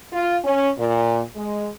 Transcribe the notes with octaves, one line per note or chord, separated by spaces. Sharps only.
F4
C#4
A#2
G#3